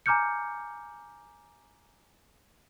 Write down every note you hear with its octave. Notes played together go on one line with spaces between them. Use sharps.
G#5 A#5 D6 F6 G6 C#7